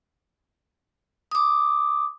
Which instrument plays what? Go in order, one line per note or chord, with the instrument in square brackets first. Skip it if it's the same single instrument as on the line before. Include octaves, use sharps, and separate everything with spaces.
[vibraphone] D6 D#6